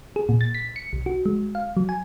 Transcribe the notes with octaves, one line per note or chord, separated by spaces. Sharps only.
G#4
A#2
A6
B6
C#7
B1
F#4
G#3
F5
F#3
G#5